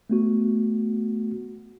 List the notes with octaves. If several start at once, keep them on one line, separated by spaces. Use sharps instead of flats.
A3 B3 F#4